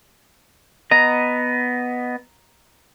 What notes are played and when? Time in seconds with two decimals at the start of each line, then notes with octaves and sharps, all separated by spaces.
0.91 B3 D#5 A#5